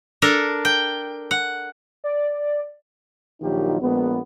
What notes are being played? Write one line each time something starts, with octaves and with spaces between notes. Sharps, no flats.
D4 A4 A#4
G5
F#5
D5
A#1 D#3 F#3 D#4 F4 G4
A#1 G#3 A#3 B3